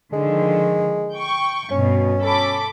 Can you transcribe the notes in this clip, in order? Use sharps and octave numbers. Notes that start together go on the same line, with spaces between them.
D3 D#3 F3 G#3
G5 C#6
G2 B2 C#4
A4 B5 D6